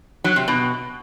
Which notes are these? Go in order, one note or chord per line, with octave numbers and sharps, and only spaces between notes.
F#3
C3
B2